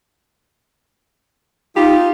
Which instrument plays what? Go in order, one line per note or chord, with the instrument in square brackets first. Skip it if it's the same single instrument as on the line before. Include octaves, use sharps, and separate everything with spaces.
[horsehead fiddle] D#4 [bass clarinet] F4 [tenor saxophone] G4